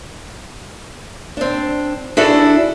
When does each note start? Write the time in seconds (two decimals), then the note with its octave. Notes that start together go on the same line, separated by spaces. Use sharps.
1.37 C4 D4
2.17 D4 E4 F#4 G#4 A4 D5